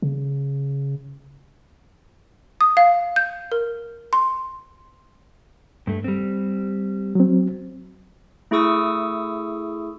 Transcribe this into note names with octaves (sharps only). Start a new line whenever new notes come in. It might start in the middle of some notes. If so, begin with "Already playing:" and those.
C#3
D#6
F5
G6
A#4
C6
G2 A3
G3 C4
F#3 C4
A3 E4 G#4 C#6 D#6 E6